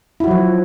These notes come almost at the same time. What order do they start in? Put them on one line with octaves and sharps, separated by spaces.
E4 F#4 F#3 F3